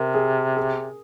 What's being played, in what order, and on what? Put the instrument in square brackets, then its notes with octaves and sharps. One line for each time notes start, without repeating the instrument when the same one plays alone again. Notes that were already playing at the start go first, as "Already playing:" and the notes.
Already playing: [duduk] C3 [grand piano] A#4
[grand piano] G#4
G#4